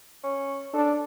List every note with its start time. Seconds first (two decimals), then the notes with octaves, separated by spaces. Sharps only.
0.24 C#4
0.74 D4 A4